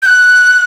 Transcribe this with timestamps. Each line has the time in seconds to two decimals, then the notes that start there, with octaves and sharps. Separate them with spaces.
0.02 G6
0.06 F#6